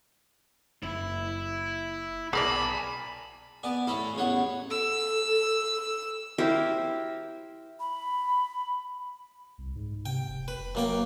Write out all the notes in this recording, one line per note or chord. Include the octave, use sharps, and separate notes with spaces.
F#1 E4
B1 G#4 A#4 D5 G#5 A5 B5
B3 D5 G#5
A2 E4 A4 B5
A1 E2 C#5 F#5
A4 E6
E4 G4 A#4 C5
B5
C2
G#2
C3 G5
F1
F1 B4
F#2 A#3 G5